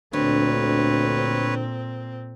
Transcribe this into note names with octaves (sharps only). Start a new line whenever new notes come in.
D2 A#2 D3 C4 B4 C#5